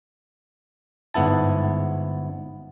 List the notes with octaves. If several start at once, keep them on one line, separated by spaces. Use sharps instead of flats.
G1 G#2 B3 E4 A5